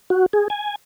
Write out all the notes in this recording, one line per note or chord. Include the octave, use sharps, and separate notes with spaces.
F#4
G#4
G#5